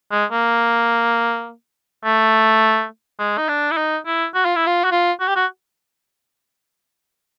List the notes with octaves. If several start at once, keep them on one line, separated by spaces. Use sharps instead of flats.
G#3
A#3
A3
G#3
D#4
D4
E4
D#4
E4
F#4
F4
E4
F4
F#4
F4
F#4
G4
F#4